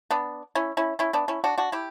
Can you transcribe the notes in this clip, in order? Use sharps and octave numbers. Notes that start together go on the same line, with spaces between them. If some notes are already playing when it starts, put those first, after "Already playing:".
B3 D4
C#4 E4
C#4 E4
C#4 E4
B3 D4
C#4 E4
D4 F#4
D4 F#4
E4 G4